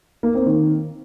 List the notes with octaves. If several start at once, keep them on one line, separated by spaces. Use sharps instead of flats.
A#3
C4
D#3